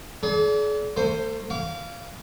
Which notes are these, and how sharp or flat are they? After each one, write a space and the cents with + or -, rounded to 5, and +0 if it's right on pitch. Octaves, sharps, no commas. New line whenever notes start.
D4 -30 G#4 +40
A3 +40 C5 +0
F5 -15 D6 -40